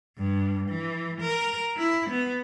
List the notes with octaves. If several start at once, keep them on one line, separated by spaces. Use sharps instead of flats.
G2
E3
A#4
E4
B3